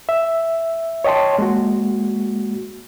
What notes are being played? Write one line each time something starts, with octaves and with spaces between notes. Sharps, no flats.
E5
C#5 D#5 G5 A5 C6
G#3 A#3 F#4